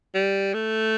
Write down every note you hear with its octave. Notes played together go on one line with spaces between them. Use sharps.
G3
A3